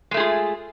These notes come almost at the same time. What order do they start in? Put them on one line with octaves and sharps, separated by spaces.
G#3 A3 G#4 F4